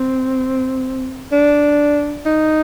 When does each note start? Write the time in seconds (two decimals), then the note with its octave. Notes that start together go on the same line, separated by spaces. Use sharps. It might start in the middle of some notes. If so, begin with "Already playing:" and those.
Already playing: C4
1.32 D4
2.26 D#4